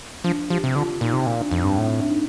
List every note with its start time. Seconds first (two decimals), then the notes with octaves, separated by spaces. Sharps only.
0.24 F3 D4
0.49 F3 G4
0.64 C3
0.76 D3 F4
1.01 A#2 D#4
1.13 C3
1.26 A#2
1.39 D4
1.50 F2 C4
1.60 G2 D4
1.77 A2 C4
2.00 D4
2.08 D#4